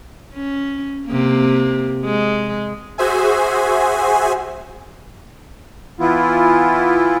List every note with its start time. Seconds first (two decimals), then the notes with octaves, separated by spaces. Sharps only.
0.34 C#4
1.06 C3 A#3
2.04 G#3
2.98 F#4 G#4 C5 E5 G#5
6.00 E3 B3 E4 F4